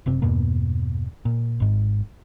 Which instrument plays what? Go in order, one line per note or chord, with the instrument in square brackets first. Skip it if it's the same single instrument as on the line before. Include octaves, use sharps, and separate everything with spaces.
[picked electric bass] F#1 C3 C4
E2 G2 B2 A#3
A#2
G#1 G#2